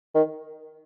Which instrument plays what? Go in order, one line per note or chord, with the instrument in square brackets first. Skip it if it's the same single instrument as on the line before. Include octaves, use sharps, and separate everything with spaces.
[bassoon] D#3